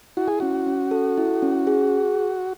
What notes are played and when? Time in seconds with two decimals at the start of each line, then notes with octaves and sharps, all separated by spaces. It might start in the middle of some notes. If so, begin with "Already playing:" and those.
0.17 E4 F#4
0.28 G#4
0.40 C#4 F#4
0.67 C#4
0.91 A4
1.17 E4
1.42 C#4
1.67 G#4